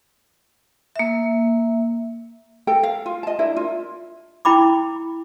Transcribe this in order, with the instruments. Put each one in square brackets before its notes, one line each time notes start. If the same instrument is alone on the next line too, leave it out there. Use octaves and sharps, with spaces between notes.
[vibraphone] A#3 E5
[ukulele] A4 A#4 G5
F5
F4
D#5 A5
D4 E4 A#4
F4
[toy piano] E4 G5 B5 D6